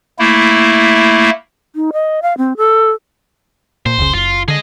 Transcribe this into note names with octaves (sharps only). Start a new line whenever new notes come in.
A3 A#3 E4
D#4
D#5
F5
C4
A4
A#2 C5
F1 C#2 C#3
F#1 F4
D3 G#4 D#5